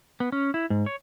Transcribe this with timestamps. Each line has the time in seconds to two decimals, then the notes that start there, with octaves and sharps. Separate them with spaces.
0.20 B3
0.32 C#4
0.54 E4
0.70 G#2
0.86 C#5